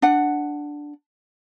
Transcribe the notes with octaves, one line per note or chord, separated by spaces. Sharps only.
D4 F#5